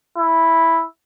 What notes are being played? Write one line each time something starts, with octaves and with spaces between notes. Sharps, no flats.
E4